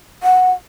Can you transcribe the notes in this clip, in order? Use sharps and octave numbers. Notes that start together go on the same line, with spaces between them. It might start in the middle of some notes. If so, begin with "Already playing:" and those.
F#5